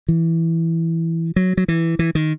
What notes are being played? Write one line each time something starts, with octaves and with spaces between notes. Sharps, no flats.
E3
F#3
F#3
E3
E3
D#3